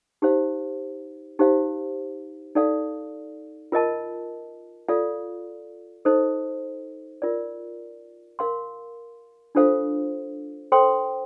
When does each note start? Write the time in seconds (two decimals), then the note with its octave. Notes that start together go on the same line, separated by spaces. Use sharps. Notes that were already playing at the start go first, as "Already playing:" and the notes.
0.22 D#4 G4 C5 F5
1.39 D#4 G4 C5 F5
2.55 D#4 A4 D5 F5
3.72 F4 A#4 D#5 A5
4.89 F4 A4 D5 F5
6.05 D#4 A4 C5 D#5
7.22 F4 A#4 D5
8.39 A#4 F5 C6
9.55 D4 F4 A4 C5 F5
10.72 A4 C5 G5 C6